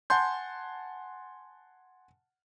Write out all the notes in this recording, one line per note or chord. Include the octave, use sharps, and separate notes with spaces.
F#5 G#5 A5 C6 G6